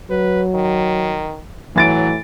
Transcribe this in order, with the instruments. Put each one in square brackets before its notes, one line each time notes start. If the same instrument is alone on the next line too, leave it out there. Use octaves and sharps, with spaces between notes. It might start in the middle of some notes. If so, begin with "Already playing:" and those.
[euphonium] F#3 [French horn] B4
[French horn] D#3
[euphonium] A2 [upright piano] E3 A6 D7 [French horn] F#3